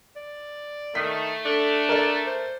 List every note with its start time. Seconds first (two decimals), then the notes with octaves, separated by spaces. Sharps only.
0.16 D5
0.95 D#3 A3 B6
1.46 D4 A4
1.89 A4 A#4 D5
2.26 C5